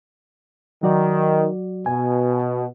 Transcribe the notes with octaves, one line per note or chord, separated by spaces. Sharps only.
D#3 F#3 F#4 D5
B2 G#5